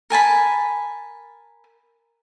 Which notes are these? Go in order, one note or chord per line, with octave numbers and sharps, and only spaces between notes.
A#4 G#5 A5 B5